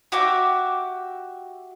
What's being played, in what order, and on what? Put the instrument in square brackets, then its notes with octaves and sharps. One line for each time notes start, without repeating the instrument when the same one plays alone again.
[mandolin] F#4 G4 E5 D6